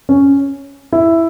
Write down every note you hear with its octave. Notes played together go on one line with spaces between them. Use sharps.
C#4
E4